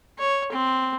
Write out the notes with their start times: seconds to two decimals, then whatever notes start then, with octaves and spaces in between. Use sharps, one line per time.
0.18 C#5
0.52 C4